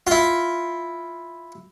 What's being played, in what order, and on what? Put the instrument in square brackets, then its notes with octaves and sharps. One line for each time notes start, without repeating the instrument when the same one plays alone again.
[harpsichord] E4 F4